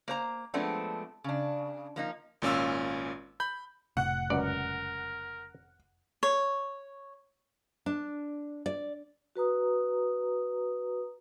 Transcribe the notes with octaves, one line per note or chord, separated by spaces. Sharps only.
A#3 C5 A#5
F3 G#3 A3 B3 C4 D4
C#3 D4
F3 A#3 D#4
G#1 A#2 C#4 F4 E6
B5 G6
F1 A2 C3 F#5
C#2 F#2 A#4 D5
C#5
D4
D5
F#4 B4 A#5 D#6